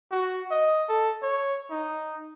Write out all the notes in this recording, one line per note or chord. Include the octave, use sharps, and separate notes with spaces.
F#4
D#5
A4
C#5
D#4